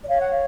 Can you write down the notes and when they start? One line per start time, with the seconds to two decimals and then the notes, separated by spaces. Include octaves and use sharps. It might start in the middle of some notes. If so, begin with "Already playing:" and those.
0.04 D5
0.09 C#5 F5
0.20 F#5
0.31 F5